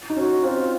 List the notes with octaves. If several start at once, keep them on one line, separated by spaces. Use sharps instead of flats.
D#4
C#4 F#4
C4 F4